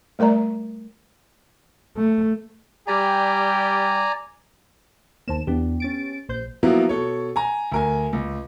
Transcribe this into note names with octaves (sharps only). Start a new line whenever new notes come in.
G3 A3 A#4 D5 A#5
A3
G3 G4 D5 G#5 A#5
D#2 A#3 C5 A5 E7
E2 B3 D4 G4
C#4 A6 D7
A#1 C5 G6
F3 F#3 A#3 B3 E4
B2 A4 C#5
G#5 A#5
D2 A#4 G#5
C#2